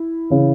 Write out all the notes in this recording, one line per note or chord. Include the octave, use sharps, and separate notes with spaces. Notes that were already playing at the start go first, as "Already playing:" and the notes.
Already playing: E4
C#3 E3